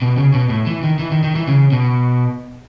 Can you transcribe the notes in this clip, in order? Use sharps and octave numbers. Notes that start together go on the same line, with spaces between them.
B2
C#3
B2
A2
E3
D#3
E3
D#3
D#3
E3
C#3
B2